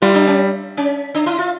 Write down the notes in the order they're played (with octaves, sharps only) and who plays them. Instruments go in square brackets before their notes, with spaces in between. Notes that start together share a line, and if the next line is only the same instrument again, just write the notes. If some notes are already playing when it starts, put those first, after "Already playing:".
[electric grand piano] G3 [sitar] E4
[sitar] D4
C#4
C#4
D4
E4
F4